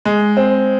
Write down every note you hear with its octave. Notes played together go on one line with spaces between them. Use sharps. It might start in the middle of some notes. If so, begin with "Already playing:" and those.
G#3
C4